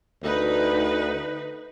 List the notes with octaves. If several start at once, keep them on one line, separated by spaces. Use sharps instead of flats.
D2 D#4 B4